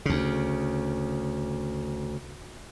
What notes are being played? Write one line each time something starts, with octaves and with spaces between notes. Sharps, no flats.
D2 C#3